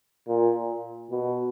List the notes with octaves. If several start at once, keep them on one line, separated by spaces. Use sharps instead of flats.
A#2
B2